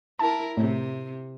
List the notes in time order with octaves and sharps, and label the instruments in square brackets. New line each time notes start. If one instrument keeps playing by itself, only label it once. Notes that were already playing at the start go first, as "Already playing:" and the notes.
[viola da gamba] E4 A#4 [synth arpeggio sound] A5
[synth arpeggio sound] A2 [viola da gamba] C3